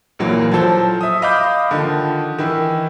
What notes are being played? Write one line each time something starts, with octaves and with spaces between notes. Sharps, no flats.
A#1 A#2 E3 F#3 A#3
F3 F#3 A4 C5
E5 D#6
D#5 F5 B5 D6 G6
D3 D#3 F3
D#3 E3 E4